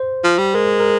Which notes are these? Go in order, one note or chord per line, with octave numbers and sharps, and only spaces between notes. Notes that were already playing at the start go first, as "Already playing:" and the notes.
Already playing: C5
F3
G3
G#3 A#4
A#4